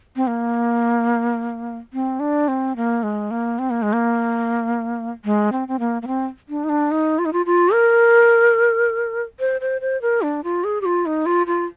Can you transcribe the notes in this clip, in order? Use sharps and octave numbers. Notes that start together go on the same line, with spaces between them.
C4
A#3
C4
D4
C4
A#3
G#3
A#3
C4
A#3
G#3
A#3
G#3
C4
C4
A#3
A#3
C4
D4
D#4
D4
D#4
F4
D#4
F4
F4
A#4
C5
C5
C5
A#4
D4
F4
G#4
G4
F4
D#4
F4
F4